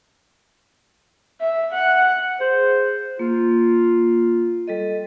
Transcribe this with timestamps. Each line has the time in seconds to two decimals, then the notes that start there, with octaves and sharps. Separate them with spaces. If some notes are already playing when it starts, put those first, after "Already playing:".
1.40 E5
1.73 F#5
2.40 G#4 C5
3.19 A#3 F4
4.68 G3 A4 D#5